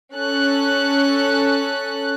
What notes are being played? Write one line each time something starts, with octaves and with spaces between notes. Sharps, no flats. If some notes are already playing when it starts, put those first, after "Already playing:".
C#4 A4 F#6